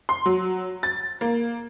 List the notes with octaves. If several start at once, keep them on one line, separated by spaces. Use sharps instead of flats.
C6
F#3
A6
A#3